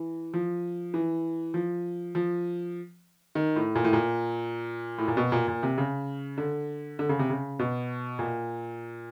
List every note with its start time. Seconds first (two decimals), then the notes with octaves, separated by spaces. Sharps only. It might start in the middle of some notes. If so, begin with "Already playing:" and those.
Already playing: E3
0.34 F3
0.94 E3
1.54 F3
2.15 F3
3.35 D#3
3.56 A2
3.75 A#2
3.84 A2
3.93 A#2
4.98 A2
5.08 A#2
5.17 B2
5.32 A#2
5.48 A#2
5.63 C3
5.78 C#3
6.38 D3
6.99 D3
7.09 C#3
7.19 C3
7.30 C#3
7.59 B2
8.19 A#2